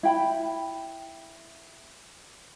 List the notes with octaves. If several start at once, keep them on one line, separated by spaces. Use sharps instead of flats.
E4 G5 B5